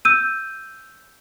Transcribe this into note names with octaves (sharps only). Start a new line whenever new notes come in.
E6 G6 D#7